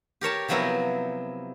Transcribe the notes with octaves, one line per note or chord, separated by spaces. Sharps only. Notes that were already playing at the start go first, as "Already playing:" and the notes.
G4 A#4 C#5 A5
C3 F3 F#3 B3 E4 A#4